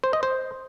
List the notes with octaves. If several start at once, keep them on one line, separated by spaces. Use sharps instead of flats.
C5
D#5
C5